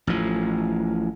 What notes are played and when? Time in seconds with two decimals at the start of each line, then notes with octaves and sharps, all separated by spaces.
0.07 A1 A2 F3